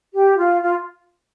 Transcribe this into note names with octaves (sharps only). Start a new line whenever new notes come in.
G4
F4
F4